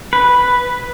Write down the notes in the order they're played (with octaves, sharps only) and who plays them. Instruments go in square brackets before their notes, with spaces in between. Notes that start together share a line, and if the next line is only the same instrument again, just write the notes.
[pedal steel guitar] B4